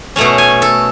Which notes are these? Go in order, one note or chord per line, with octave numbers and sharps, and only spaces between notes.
B2 A3 C#4 A5
G#5
A4